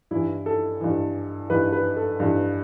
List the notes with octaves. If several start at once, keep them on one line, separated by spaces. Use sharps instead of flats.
G2 E3 E4
A4
G2 E3
G2 E3 B4
B4
A4
G2 E3